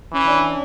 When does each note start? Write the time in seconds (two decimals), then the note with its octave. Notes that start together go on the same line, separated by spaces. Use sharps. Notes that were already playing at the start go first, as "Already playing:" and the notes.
0.13 E3 C#4
0.26 D4
0.40 C#4